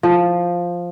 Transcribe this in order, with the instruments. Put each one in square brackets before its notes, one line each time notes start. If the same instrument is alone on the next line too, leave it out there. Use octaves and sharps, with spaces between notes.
[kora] F3